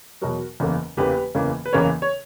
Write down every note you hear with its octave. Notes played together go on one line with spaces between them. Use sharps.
E2 B2 F#3 F#4 A#4
F#1 E2 C#3 E3 A#3
F#1 E2 C#3 E3 A#3 G4 B4
F#1 E2 C#3 E3 A#3
B4
F#1 E2 C#3 E3 A#3 A#4 C#5
C#5